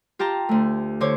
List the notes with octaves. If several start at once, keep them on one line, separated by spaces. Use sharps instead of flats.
F4 G4 A5 A#5
D2 A3
D3 C5 C#5 D6